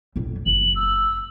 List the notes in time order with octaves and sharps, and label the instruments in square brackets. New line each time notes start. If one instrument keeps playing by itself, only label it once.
[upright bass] A#1 F2
[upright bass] F#1 [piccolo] F#7
[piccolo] E6